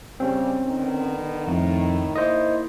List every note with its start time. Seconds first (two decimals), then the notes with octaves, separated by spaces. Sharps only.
0.20 C#3 G3 C4 C#4
0.65 D3 D#3 B3
1.47 F2 A2 D#3
2.16 A#3 D#4 E4 C5 D#5